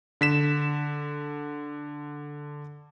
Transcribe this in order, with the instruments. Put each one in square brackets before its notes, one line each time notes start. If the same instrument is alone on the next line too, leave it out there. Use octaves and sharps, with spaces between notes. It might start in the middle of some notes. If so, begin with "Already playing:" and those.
[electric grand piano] D3 B6 E7